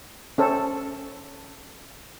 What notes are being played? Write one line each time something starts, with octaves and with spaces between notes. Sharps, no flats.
C#4 A4 C5